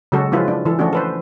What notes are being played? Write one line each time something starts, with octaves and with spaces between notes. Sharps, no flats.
C#3 F#3 G#3 F#4 A4
F3 F#3 G#3 E4 F4 B4
D4
E3 A4
F3 A3 C#4 D4 F#4
A4 B4 C5